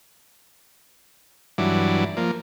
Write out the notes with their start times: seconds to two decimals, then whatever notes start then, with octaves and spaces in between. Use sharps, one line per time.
1.58 G2 E3 F#3 D4
2.17 F3 A#3